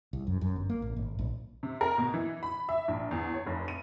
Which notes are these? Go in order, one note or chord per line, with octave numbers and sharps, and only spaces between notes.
C2
F#2
F#2
G1
A#3
A1
G#1
A#1
C3
A#4
B2
E3
B5
E5
A#1
E2
C#5
F1
D#7